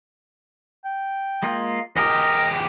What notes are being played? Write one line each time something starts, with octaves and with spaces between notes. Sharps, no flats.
G5
G#3 A#3 F4
E2 G4 A#4 D#5